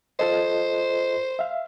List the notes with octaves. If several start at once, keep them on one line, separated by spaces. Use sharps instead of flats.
F4 A4 C5 D#5
E5 F5